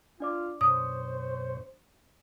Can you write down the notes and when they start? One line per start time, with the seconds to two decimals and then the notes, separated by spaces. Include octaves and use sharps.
0.20 D4 F4 D5 D6
0.61 F#2 B2 C5 C#5 D#6